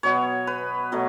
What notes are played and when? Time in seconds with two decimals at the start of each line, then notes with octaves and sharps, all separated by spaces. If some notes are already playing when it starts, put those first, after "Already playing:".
0.03 B2 F#3 B3 C#5
0.47 B4
0.92 B2 F#3 A3